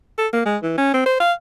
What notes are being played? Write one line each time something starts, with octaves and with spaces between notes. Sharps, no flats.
A4
A#3
G#3
E3
C#4
C4
C5
F5